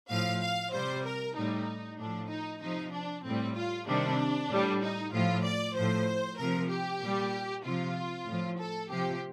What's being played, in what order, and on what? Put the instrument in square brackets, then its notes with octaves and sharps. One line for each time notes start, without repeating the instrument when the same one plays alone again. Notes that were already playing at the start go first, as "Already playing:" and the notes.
[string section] A2 F3 F5
F5
C3 G3 C5
A#4
A2 G3 D#4
A2 F3 D4
D#4
C3 F3 D#4
D4
A2 G3 C4
F4
C3 D#3 G3 D4
A2 G3
D#4
A2 F3 F4
D5
A2 F3 C5
C3 F3 A#4
G4
A#2 G3
C3 F3 F4
A2 F3
A4
C3 F3 G4